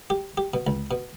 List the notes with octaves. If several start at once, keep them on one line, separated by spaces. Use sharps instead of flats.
G4
G4
B2
C#2
B2